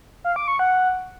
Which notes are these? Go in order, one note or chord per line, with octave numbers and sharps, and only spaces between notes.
F5
D6
C#6
F#5